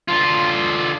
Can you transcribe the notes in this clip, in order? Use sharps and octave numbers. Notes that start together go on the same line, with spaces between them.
D3 F4